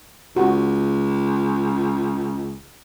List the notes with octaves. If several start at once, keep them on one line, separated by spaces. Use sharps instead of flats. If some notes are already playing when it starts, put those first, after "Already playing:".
C#2 F#4